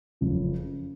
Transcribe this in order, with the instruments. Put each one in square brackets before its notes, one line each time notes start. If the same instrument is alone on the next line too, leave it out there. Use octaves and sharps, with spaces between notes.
[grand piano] F#1 F2 C#3 F3